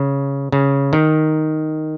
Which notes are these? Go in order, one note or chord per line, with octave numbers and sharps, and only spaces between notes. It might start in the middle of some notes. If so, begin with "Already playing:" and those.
Already playing: C#3
C#3
D#3